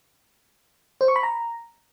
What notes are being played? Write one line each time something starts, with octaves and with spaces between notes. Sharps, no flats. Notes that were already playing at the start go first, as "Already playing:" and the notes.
C5
C#6
B5
A#5